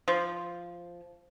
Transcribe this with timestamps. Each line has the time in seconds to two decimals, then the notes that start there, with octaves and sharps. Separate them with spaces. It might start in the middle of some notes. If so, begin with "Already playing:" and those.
0.08 F3